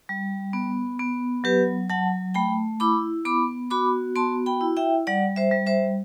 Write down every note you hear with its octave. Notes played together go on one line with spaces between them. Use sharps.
G3
B3
B3
F#3 G4 B4
F#3 F#5 A5
A3 G5 B5
E4 B5 D6
B3 B5 D6
F#4 B5 D6
B3 A5 C6
G5 B5
E4
E5 G5
G3 D5 F#5
C5 E5
G3
C5 E5